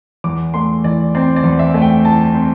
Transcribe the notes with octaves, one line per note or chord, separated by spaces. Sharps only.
E2 D6
A3 C6
E3 D5
C4 D5
D5
E2
E5
A3
G5
E3 A5
C4